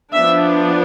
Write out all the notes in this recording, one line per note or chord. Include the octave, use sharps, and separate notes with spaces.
F3 B3 D4 E5